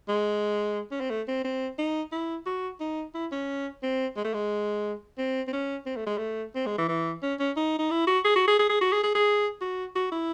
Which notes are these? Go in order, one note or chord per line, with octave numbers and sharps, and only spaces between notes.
G#3
C#4
C4
A3
C4
C4
D#4
E4
F#4
D#4
E4
C#4
C4
G#3
A3
G#3
C4
C4
C#4
C4
A3
G#3
A3
C4
G#3
E3
E3
C#4
C#4
D#4
D#4
E4
F#4
G#4
F#4
G#4
G#4
G#4
F#4
G#4
G#4
G#4
F#4
F#4
E4